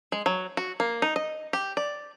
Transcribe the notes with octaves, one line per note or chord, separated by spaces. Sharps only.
G#3
F#3
F#4
A#3
D#4
D#5
G4
D5